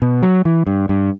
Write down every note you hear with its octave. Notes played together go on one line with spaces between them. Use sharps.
B2
F#3
E3
G2
G2